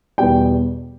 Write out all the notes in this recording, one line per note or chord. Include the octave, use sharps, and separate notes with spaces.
E2 B2 G3 G5